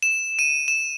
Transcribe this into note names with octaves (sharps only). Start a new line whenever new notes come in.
E7
D#7
E7